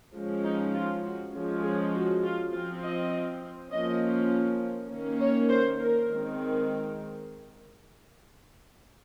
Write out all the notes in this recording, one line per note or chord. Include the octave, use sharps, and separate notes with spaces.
F3 G#3 C#4
D#4
F4
F#4
F3 G#3 C#4
G#4
F#4
F4
F3 C4 F4
D#5
F3 A#3 C#4 D#5
D#3 A#3 C#4
C#5
C5
A#4
D#3 G#3 C4